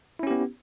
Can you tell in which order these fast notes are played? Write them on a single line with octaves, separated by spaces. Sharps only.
E4 C#4 G4 B3